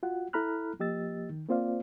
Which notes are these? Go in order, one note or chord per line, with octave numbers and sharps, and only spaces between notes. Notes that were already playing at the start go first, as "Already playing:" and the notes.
F4 F#4 F#5
E4 A4 A#5 B5 F6 F#6
F3 A#3 G4 D#5 E6 A6
D#3
A#3 C4 F4 C5 D5 F5